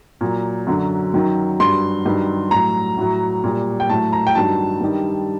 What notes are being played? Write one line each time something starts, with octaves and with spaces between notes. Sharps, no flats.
A#2 F#3
F#2 D3 F#3
F#2 D#3 F#3
G2 F#3 C6
G2 D#3 F#3
A2 F#3 A#5
A2 F#3
A#2 G3
G5
A2 F#3 A5
A#5
G5
G2 D#3 F#3 A5
G2 D#3 G3